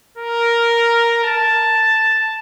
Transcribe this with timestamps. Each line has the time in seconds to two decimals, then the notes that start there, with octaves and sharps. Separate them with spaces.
0.17 A#4
1.24 A5